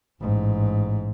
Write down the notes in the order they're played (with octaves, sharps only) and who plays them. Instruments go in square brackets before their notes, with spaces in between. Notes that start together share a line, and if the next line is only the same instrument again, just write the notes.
[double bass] A1 G#2